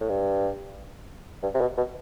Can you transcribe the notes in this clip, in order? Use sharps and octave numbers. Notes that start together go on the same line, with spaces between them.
A2
G2
G2
C3
B2
B2